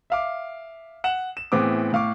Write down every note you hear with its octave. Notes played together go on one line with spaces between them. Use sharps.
E5 F5 D6
F#5 E7
E7
A2 E3 B3 C4 G#4 D6
A2 F5 C#6 D6